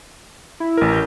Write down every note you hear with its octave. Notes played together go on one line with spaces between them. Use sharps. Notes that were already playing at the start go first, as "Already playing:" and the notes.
E4
A1 A#4
G6